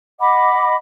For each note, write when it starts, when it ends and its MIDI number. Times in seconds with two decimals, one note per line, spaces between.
0.20 0.75 75
0.20 0.75 78
0.20 0.75 83
0.20 0.75 86